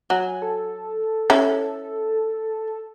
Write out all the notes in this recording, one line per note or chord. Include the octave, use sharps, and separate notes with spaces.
F#3 G#5
A4
C#4 E4